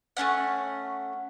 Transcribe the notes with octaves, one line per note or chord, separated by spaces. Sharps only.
A3 B3 C#4 F#5